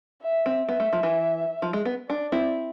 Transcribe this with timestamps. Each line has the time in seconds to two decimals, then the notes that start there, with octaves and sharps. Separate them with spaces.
0.22 E5
0.46 C4
0.69 B3 E5
0.80 A3
0.93 F3
1.03 E3
1.62 F3
1.73 G#3
1.85 B3
2.09 D4 D5
2.32 C4 E4